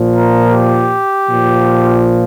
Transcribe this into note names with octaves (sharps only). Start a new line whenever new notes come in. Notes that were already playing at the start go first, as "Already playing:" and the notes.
Already playing: A#2 F3
A#4
G4
A#2 F3